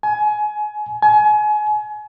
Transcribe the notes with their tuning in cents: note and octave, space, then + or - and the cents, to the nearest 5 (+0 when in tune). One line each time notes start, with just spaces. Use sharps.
G#5 +25
G#5 +30